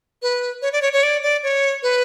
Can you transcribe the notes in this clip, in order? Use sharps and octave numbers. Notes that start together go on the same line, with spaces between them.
B4
C#5
D5
C#5
C#5
D5
D5
C#5
B4